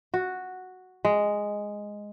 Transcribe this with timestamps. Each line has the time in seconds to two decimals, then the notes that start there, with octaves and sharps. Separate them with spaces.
0.14 F#4
1.05 G#3